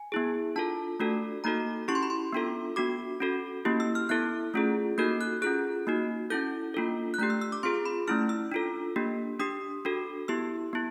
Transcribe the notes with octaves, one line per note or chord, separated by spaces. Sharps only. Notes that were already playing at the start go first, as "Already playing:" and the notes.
Already playing: G#5
B3 E4 G#4
D4 F4 A4 A5
A3 D4 F#4 A4
A#3 D#4 F#4 A4 A#5
C#4 E4 G4 C#6
C6
B5
C6
B3 D4 F4 A4
B3 D4 F#4 D6
C#4 F#4 A4
A#3 C#4 E4 G4
E6
F6
B3 E4 A4 F#6
A3 C#4 F4 G#4
A#3 D#4 F#4 A4 G6
F#6
C#4 F4 G#4 F#6
A#3 D#4 F#4
C#4 E4 A4 G6
A#3 D4 F4 A4
F#6
A3 D4 G4 G6
E6
E6
D6
C4 F4 G#4 C6
B5
A3 C#4 E4 F6
E6
D4 F4 A4
A#3 D4 G4
D4 G4 D#6
D4 F#4 A4
B3 E4 G4 E6
B3 E4